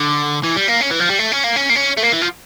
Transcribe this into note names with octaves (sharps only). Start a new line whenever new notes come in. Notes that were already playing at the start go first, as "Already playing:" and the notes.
Already playing: D3
E3
G3
A#3
C#4
E3
F3
G3
A3
C#4
A#3
C#4
A#3
C#4
A3
A#3
E3
F3